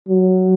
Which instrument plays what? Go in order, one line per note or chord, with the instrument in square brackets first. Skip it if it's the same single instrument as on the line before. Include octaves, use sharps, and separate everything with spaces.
[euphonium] F#3